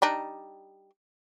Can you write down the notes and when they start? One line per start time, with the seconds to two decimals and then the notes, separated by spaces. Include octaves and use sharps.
0.02 G3 D4 D#4